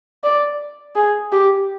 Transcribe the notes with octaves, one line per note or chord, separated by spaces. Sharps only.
D5
G#4
G4